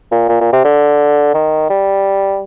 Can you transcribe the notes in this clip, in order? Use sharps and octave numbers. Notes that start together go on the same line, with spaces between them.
A#2
A#2
A#2
C3
D3
D#3
G3